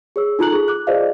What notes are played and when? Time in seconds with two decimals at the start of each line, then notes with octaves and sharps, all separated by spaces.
0.16 G#4 C#5 E6
0.39 D#4 F4 A4 A#5 F#6 F#7
0.53 G#4
0.68 D6 F#6
0.87 F4 G#4 C5 D5 D#5 F5